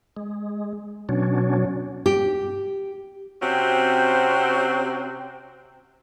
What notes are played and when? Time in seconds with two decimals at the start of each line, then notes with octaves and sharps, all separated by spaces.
0.17 G#3
1.09 B2 F#3 C#4 D4
2.06 G4
3.42 C3 C4 C#4 F#4 C5